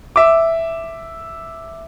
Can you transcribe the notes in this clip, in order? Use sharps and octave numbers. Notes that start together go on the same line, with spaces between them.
E5 D6